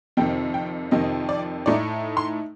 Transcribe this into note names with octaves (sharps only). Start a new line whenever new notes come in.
F2 C3 D#3 G5
G5
F2 C3 D#3 D#5
D5
A2 A3 D#4 D5
C6